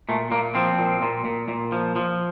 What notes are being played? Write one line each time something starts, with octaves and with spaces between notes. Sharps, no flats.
A#2 A3
A#2 A#3
F3 C4
A#2
A#2
A#2
A#2
F3
F3